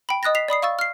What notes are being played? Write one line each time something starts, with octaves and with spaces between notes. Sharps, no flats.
G5 B5
D#5 D#6 F#6 A6 A#6
B6 C7 F7
D5 B5 D#6 C7
F5 C#6 E6 A6
F6 C7